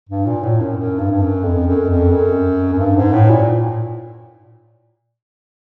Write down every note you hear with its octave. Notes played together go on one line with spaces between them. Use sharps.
G2
A#2
A2
F#2
F#2
G2
G2
F#2
F2
F#2
F2
F#2
F#2
G2
G#2
A2
A#2